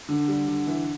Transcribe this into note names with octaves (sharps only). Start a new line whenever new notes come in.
D3
G3
D3
E3